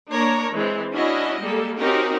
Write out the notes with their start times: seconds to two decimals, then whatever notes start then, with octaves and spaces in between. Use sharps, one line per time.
0.11 A#3 D4 A#4 C#5 A#5
0.52 E3 G#3 C4
0.92 C#4 D4 E4 F#4 D#5
1.40 G3 G#3 A#3 A4
1.77 C4 C#4 D#4 F#4 G4 A#4